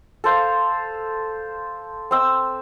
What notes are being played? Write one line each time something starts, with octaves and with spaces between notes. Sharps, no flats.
A4 C5 F5
C4 E6